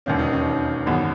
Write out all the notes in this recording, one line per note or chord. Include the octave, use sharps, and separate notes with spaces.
E1 D#2 D#3 A#3 C#4
D#4
C#4
G#1 F#2 E3 G#3 B3